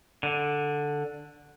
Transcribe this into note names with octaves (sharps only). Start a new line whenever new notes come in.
D3